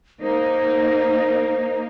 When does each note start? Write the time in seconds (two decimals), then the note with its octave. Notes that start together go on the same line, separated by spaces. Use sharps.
0.22 A#3 D#4 C5